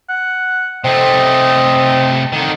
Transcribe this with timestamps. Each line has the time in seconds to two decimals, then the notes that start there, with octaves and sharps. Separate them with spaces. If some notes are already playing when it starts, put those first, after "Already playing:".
0.09 F#5
0.84 C3 A3 C4 D#5
2.33 D3 D#3